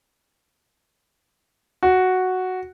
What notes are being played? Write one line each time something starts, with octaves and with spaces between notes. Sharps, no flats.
F#4